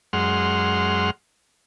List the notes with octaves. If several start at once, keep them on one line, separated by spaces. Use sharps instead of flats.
F#2 G#3 F#5 C6 F6